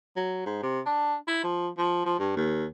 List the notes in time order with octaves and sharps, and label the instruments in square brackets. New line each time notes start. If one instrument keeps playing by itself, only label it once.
[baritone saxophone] F#3
G#2
C3
D4
E4
F3
F3
F3
G2
D#2